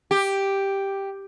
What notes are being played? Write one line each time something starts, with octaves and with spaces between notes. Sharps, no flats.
G4